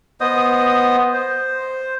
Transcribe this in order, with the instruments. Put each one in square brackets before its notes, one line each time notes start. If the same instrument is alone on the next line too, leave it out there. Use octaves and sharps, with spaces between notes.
[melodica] B3 C5 D#5 D#6
C5